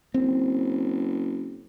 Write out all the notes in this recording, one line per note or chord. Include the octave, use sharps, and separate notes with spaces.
F#1 C4